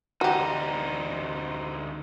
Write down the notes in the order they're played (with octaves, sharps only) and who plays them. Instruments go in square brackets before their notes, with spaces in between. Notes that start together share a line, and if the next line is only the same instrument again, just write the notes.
[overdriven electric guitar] D2 D#4 [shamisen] F#4 G4